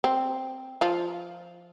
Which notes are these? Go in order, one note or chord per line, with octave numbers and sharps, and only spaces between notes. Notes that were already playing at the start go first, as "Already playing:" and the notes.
C4
F3 F4